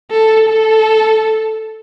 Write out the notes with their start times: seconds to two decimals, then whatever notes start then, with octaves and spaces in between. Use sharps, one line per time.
0.11 A4
0.49 A4